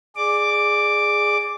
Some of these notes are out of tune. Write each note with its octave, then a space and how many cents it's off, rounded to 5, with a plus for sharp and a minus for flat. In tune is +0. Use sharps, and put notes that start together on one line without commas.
G#4 +0 D5 +25 D6 +0